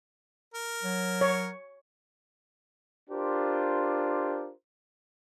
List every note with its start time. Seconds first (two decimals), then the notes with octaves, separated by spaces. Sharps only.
0.54 A#4
0.83 F#3
1.21 C#5
3.10 D4 F4 G4 A#4 C5